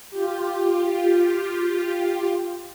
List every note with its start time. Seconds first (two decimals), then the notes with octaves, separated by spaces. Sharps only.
0.10 F4 G4